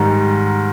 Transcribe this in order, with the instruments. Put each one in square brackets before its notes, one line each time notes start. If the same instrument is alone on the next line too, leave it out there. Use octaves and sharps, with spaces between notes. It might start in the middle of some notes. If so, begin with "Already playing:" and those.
Already playing: [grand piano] G#2 D#3 G3